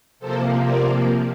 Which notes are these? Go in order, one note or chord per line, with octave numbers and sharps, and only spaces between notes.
C3 F3 A#3 A4 C5
A#4 D5